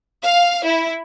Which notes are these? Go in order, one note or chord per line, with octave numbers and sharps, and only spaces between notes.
F5
E4